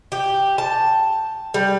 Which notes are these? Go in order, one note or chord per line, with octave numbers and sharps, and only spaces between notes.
G4
A5
G3